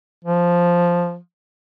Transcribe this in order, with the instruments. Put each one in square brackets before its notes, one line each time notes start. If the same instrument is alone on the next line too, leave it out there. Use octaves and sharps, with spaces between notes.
[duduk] F3